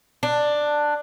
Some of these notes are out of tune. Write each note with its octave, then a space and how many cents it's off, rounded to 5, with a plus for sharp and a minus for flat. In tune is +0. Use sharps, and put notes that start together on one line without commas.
D4 +10